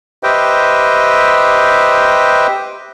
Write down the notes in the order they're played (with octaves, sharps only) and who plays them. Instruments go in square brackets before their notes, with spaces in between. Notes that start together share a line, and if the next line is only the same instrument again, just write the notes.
[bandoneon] G4 B4 C5 D#5 E5 G5